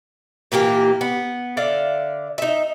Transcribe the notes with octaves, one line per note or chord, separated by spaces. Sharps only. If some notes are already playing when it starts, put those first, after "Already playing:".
A#2 E3 A#3 G4
B3
D3 D5 E5 F5
D#4 E5